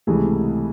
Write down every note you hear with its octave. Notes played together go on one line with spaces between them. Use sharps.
C#2 C3 E3 A3 G#4